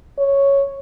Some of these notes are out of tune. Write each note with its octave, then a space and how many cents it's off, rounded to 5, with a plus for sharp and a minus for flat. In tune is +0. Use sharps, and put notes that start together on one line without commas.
C#5 +0